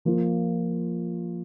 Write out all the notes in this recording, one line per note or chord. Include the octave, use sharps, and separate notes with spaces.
F3 A#3 F4